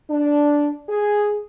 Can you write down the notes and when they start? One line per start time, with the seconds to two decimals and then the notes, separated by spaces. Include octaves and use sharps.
0.10 D4
0.89 G#4